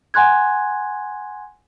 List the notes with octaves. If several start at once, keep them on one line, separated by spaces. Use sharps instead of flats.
F#5 G#5 C6 F#6 G#6